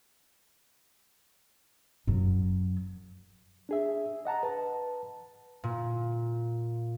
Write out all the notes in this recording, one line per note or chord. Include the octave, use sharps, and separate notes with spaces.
F#2 F#3
D4 G#4 E5
D#5 F#5 A5 A#5
B4 A5
A#2